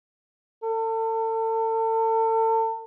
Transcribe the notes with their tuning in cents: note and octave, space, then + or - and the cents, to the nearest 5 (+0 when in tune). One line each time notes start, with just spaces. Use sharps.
A4 +35